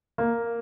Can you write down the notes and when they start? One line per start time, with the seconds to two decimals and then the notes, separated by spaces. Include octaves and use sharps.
0.18 A#3